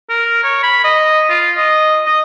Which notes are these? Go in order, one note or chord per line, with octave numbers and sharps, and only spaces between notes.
A#4
C#5
B5
D#5
F4
D#5
D#5